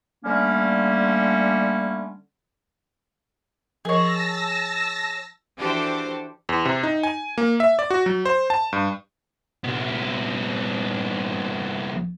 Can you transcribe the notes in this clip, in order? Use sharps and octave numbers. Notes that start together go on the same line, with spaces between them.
D3 G3 A3 A#3 C#4
F3 G#4 A#4 C#5 D#5 A5 E6 A#6
E3 D4 F#4 G4 A4 C5
E2
C3
D#4
G#5
A#3
E5
D5
F#4
F#3
C5
A5
G2
C2 B3